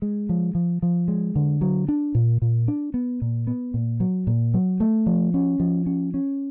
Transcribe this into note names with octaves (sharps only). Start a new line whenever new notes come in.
G#3
F3
F3
F3
G#3
D3
F#3
D4
A#2
A#2
D4
B3
A#2
B3
A#2
F#3
A#2
F#3
A3
F3
C#4
F3
C#4
C#4